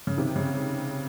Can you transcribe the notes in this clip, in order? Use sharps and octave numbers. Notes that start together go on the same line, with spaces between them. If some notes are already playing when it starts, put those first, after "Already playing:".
C#3
C3 D#3
C#3